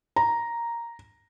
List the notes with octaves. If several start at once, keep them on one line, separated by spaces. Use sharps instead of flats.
A#5